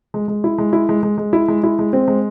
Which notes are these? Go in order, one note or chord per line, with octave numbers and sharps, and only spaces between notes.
G#3
G#3
E4
G#3
E4
G#3
G#3
G#3
E4
G#3
E4
G#3
C4
G#3